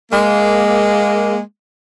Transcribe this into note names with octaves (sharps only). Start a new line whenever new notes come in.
G#3 A#3